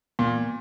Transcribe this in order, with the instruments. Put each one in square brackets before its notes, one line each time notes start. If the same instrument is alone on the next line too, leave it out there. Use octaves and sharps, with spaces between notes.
[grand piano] A#2